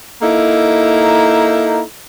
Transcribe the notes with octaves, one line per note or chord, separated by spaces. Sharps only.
A#3 D#4 E4 A4